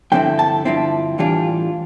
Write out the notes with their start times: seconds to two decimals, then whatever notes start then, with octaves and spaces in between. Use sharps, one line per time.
0.12 G2 D3 F3 C4 E4 G5
0.39 A5
0.65 G2 D3 F3 C4 E4
1.18 A2 E3 G3 D4 F4